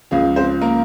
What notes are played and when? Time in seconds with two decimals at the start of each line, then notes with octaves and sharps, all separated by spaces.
0.11 C#2 C#3 F3 G#3 G#4
0.36 C4 C5
0.61 A#3 A#4